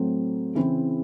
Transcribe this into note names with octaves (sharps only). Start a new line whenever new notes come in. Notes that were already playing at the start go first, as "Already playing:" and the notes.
Already playing: A2 F#3 C4
C#3 E3 C4 E4